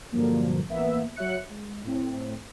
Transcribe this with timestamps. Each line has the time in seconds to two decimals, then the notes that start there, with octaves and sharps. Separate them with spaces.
0.12 G2 A#2 D3 F3 F#3 A#3
0.68 A1 A#3 B3 E5
1.16 F#3 F#4 C#5 E5 F#6 C#7
1.50 G#3
1.84 A2 C4